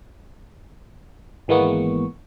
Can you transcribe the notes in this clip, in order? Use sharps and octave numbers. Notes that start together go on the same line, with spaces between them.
G#1 E3 G#3 A#3 B3 C#6